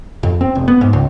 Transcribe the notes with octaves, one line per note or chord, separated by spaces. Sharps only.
F2
C4
F1
B3
G#2
C#2